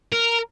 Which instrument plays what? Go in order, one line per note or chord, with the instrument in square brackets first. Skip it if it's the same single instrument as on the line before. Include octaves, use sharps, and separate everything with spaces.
[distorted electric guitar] A#4